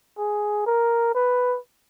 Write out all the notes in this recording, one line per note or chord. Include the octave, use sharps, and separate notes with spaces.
G#4
A#4
B4